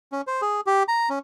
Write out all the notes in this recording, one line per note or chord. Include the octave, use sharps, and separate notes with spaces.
C#4
C5
G#4
G4
A#5
C#4